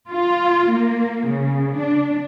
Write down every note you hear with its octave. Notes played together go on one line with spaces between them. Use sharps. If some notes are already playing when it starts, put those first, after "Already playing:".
F4
A#3
C#3
D4